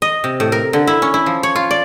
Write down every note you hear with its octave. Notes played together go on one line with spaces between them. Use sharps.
D#5
C3
A2
A#4
D3
E4
C#4
E4
F3
C#5
F4
D5